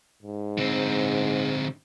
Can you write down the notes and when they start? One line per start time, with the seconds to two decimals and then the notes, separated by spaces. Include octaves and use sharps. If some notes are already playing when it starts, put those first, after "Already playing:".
0.23 G#2
0.58 D3 C4